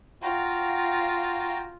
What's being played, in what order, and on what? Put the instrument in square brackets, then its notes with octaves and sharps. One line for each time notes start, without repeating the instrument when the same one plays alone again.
[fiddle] F4 [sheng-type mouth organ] F#4 G5 A#5